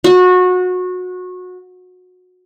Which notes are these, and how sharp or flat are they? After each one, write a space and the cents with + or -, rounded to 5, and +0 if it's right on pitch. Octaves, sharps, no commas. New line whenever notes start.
F#4 -25